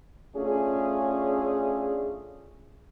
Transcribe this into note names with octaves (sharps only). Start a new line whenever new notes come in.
A3 C#4 D4 F4 G#4